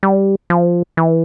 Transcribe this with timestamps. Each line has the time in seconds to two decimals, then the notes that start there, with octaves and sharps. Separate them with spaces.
0.03 G3
0.50 F3
0.97 E3